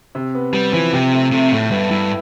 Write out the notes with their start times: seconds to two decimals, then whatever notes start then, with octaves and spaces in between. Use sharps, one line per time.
0.15 C3
0.35 B3
0.54 G3 B3
0.73 E3 F3
0.93 C3 G4
1.12 A3
1.32 C3 A3
1.51 A2 A3
1.71 G2 B3
1.90 G2 E4